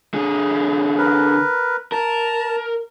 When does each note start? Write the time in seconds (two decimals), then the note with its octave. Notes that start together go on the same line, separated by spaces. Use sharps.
0.14 D3 G#4
0.98 A#4 B4
1.92 A#4 A5